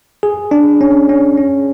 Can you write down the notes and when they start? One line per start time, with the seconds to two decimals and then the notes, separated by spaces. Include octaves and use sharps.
0.23 G#4
0.51 D4
0.81 C#4
1.09 C#4
1.37 C#4